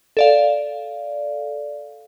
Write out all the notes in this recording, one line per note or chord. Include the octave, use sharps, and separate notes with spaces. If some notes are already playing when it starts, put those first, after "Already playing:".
A4 D5 F5